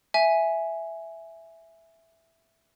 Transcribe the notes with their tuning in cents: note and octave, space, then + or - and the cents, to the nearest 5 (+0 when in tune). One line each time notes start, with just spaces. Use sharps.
E5 +0 G#5 +5